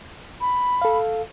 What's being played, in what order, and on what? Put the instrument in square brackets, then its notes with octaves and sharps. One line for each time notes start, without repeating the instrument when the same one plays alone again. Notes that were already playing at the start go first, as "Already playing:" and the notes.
[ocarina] B5
[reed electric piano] A4 F5